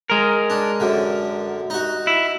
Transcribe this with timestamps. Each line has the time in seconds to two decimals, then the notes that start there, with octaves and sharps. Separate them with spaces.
0.10 G#3 A#4
0.50 D4
0.80 F#2 D3
1.70 D#4 F#4
2.07 E4